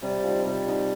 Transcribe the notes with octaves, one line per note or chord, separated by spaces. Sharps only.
C3 G3
F3 D#4
C3 G3
F3 D#4